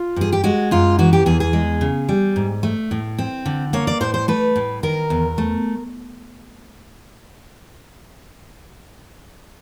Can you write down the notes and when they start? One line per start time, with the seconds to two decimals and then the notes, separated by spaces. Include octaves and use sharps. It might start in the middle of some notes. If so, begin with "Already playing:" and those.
Already playing: F4
0.16 G2 G#4
0.32 G4
0.44 G#3 F#4
0.71 F#2 F4
0.99 E3 F#4
1.13 G4
1.26 E2 G#4
1.40 G#4
1.53 G#3
1.81 C#3
2.09 G3
2.36 G#2
2.63 A3
2.91 A2
3.18 C4
3.46 D3
3.73 A#3 C#5
3.87 D5
4.01 A2 C5
4.14 C5
4.28 A3 B4
4.56 A2
4.83 D#3 A#4
5.10 E2
5.38 A3